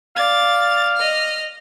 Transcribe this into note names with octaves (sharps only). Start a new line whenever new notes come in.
D5 F5 A6
D#5 F6